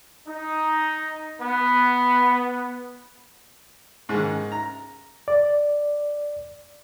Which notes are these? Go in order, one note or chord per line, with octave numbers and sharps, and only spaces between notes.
D#4
B3
G#2 D#3
A#5
D5